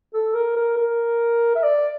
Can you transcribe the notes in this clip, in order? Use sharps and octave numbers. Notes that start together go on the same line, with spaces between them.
A4
A#4
A#4
A#4
E5
D5